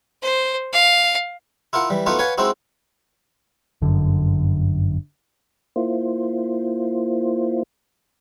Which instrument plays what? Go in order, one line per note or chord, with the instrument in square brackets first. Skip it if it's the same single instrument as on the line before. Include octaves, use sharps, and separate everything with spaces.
[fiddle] C5
F5
[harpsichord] E4 F4 A#4 F#5
E3 G3
A3 B3 D#4 F4 F#4
B4 C#5 F5 F#5 G#5
G#3 C4 D#4 E4 F#4
[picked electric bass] G1 F#2 D3
[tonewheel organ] A#3 E4 F4 C5